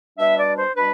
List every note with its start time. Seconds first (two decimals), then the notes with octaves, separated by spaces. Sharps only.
0.18 B2 G3 D4 E5
0.37 D5
0.56 C5
0.75 B2 G3 D4 B4